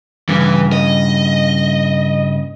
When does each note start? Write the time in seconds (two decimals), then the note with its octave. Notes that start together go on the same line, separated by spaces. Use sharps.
0.29 G2 C#3 E3
0.72 D#5